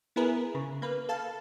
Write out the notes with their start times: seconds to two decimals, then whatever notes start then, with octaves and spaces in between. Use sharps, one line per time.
0.16 B3 E4 G#4 A#4 B4
0.55 C#3
0.82 A#3 B4
1.09 A4 F5 A5